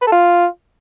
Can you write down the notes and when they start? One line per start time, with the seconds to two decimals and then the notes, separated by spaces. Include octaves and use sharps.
0.01 B4
0.07 A4
0.12 F4